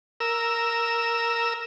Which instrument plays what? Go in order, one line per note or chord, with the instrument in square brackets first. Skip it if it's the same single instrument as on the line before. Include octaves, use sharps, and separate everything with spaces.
[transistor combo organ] A#4 E6